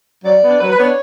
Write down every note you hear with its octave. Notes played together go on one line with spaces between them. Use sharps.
F#3 D5
B3 D4
F#3 B4
B4
B3 D4 C#5